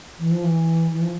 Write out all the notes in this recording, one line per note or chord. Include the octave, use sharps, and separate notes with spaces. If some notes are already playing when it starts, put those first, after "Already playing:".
E3
F3
E3
E3
F3